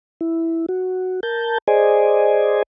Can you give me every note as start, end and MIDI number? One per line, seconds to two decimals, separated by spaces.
0.21 0.66 64
0.69 1.20 66
1.23 1.58 70
1.23 1.58 81
1.23 1.58 91
1.68 2.63 68
1.68 2.63 72
1.68 2.63 74
1.68 2.63 75
1.68 2.63 80